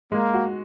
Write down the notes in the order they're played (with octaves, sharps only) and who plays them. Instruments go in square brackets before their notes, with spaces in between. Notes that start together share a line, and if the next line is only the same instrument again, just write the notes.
[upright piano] G#3 [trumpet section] A#3
[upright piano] F#4